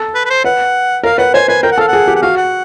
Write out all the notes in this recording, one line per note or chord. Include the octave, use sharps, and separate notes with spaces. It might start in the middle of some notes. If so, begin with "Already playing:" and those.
Already playing: A4
B4
B4
C5
B4 F#5
A#4 F5
B4 F#5
C5 G#5
B4 G#5
A#4 G5
F#5
A4 F5
G#4 F#5
G4
F#5
F#4 F5
F#5